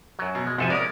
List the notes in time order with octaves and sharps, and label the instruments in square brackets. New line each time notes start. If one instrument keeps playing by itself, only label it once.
[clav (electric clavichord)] F#2 F#3
[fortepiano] B2
[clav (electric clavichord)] G#3
[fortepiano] F2 C3 [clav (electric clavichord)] G#2 A4 G#5
[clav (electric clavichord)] G#3 C#4 A#4 [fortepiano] D5 D#6